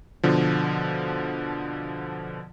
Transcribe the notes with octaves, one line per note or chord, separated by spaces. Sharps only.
B2 D3 F3